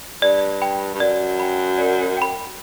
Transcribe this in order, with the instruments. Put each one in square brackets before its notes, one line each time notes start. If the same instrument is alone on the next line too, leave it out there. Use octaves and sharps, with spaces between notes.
[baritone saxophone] G2 [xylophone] D5
[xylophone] G5 B5
[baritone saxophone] G2
[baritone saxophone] F#2 [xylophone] D5
[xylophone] G5 B5
D5
G5 B5